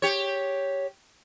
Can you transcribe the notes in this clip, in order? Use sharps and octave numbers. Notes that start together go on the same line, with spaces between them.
G4 C#5